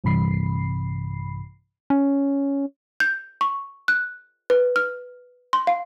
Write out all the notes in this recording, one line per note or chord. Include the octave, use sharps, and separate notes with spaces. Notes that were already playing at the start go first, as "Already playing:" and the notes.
A#1 G2 C3 E3 B5 C7
C#4
G6
C#6
F#6
B4
F6
C6
F5